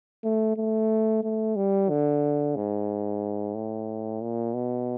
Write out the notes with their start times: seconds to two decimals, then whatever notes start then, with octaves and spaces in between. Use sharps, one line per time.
0.24 A3
0.57 A3
1.24 A3
1.56 G3
1.90 D3
2.56 G#2
3.55 A2
4.21 A#2
4.54 B2